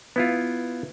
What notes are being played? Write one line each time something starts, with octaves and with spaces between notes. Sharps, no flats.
B3 E4 F4